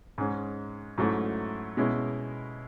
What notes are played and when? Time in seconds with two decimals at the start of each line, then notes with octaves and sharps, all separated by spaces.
0.18 G#2 G#3 C#4
0.98 G#2 F#3 A3 C#4 E4
1.77 B2 G#3 C#4 E4